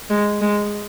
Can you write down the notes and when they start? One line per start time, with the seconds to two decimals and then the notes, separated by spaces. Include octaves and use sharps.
0.10 G#3
0.41 G#3